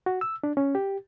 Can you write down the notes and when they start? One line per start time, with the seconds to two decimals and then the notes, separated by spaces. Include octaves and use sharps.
0.06 F#4
0.21 E6
0.44 D4
0.57 C#4
0.75 G4